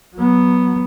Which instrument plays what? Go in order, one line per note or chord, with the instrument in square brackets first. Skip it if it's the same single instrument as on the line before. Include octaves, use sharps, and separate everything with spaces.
[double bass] F#3 B3